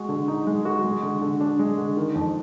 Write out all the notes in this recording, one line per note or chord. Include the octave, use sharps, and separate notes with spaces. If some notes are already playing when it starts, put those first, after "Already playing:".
Already playing: G#3 F#4
D3
D#4
G#3
F#4
G#3
D3
D3
D4
G#3
D3
D#3
F2